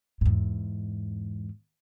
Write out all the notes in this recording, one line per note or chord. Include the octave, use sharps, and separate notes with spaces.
E2 G#2